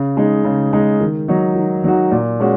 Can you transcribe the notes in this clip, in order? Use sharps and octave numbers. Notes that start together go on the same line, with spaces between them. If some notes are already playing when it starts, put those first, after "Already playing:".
Already playing: C#3
G#3 D#4
C#3
G#3 D#4
D#3
F#3 D#4 F#4
D#3
F#3 D#4 F#4
A#2
G#3 C#4 F#4